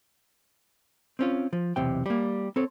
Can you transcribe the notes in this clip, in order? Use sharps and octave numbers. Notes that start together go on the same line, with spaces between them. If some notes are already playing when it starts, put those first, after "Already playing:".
C4 C#4 F4
F3
B1 E2 C3 G5
G3 A#3
C4 A4 C#5